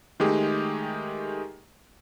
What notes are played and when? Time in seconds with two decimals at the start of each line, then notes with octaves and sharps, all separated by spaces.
0.20 D#3 G#3 A3 G4 G#4